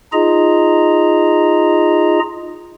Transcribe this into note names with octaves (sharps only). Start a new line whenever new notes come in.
D#4 F4 G#4 D#5 A#5